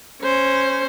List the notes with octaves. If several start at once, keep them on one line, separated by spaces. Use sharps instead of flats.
C#4 C5